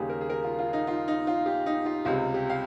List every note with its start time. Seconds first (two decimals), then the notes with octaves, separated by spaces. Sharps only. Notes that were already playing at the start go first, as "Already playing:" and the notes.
Already playing: D#2 C#3 G3 A#3 G4 G#4
0.10 A#4
0.21 G#4
0.30 A#4
0.44 F4
0.59 F4
0.73 D#4
0.87 F4
1.08 D#4
1.27 F4
1.46 G4
1.66 D#4
1.86 F4
2.05 C#2 C3 G3 F4
2.34 G4
2.50 F5